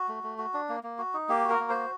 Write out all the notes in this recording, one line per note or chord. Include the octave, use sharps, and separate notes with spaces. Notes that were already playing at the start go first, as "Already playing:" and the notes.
Already playing: F#4
A3
A3
F#4
D4
A#3
A#3
F#4
D#4
A#3 G4
F#4 A#4
A#3
F#4 C5